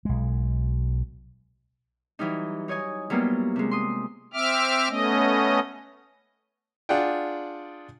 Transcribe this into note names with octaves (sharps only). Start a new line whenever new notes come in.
B1 G#3
E3 F#3 G3 D#4
D#4 C#5 D#5 G#5
F#3 G3 A#3 B3 E4 F4
C3 G#3
C6 D#6
C4 E5 D6 F6
A3 B3 C#4 D#5
D4 F4 G#4 D5 F#5 G5